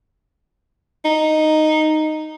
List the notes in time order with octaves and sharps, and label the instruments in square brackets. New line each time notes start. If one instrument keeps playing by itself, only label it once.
[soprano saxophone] D#4